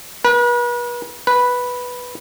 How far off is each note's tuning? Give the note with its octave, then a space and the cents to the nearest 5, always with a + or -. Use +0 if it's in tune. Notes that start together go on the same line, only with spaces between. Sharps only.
B4 -40
B4 -5